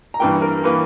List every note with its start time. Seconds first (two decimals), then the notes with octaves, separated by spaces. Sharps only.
0.14 A#5
0.19 G2 E3 A#3 G5
0.42 A#4
0.64 E3 A#3 B4